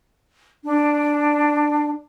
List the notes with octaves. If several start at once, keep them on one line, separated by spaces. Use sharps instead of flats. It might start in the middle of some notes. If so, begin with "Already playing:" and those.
D4